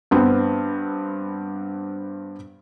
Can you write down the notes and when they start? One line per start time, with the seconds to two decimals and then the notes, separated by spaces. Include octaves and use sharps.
0.11 G2 B3 C4